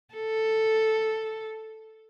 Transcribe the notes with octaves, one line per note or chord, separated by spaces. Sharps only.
A4